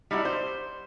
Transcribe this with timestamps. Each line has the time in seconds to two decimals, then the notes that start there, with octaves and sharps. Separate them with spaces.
0.11 G3 D#4 E4 F#4
0.25 C5